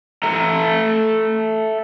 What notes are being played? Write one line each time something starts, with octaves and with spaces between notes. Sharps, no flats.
A4 E5 A#5